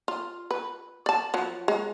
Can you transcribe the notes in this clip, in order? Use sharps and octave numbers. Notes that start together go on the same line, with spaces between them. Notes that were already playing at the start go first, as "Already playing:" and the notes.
F4
B4
D5 A5
F3 F#3
G#3